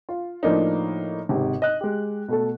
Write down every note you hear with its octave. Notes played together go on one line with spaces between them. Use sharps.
F4
A2 F3 A#3 D4 D#4
G#1 G#2 C3
D#5 F#6
G#3 G4
B2 A3 A4